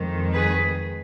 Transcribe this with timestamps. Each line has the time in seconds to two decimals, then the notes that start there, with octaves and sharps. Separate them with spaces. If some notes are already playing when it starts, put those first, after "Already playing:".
Already playing: F2 D#3 G#3
0.33 G#4 B4